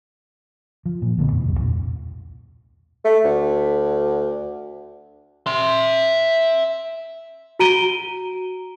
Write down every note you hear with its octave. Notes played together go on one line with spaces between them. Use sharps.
F3
A#2
B1 D3 A3 B3
F2 B2
D#1 C2 G3
E2 A#2
A3
D2
E5 C6
F#4 A#5 D7 D#7 G7